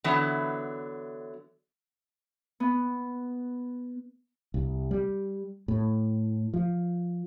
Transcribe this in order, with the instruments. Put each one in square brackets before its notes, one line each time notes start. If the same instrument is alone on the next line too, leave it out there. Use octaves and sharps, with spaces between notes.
[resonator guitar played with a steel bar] D3 E3 F#3 B3
[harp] B3
[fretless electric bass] C2
G3
A2
F3